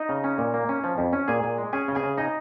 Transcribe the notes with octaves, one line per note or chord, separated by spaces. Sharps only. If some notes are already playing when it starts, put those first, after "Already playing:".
Already playing: D#4 D#5
C#3
C#4
A#2
A#3
C#4
F3
F2
C#4
A#2 G#4 G#5
A#2
G#3
C#4 G#4 G#5
C#3
G#4 G#5
C#3
D#4 D#5